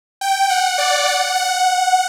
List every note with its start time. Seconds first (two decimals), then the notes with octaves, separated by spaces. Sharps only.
0.21 G5
0.50 F#5
0.78 D5
1.08 F#5
1.36 F#5